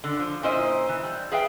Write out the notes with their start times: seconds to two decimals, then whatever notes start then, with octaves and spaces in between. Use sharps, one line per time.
0.04 D3
0.19 F3
0.43 A#2 C#4 E4 C5 D#5
0.89 E3
1.03 G3
1.32 G#4 B4 E5 F5 G5